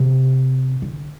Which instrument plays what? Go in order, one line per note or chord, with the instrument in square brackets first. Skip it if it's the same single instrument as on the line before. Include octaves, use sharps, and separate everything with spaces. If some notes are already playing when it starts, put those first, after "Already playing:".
Already playing: [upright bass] C3
D3